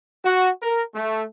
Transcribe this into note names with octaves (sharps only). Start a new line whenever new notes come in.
F#4
A#4
A3